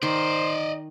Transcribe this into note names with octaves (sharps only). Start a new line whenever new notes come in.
D#3 C5 D5 D#5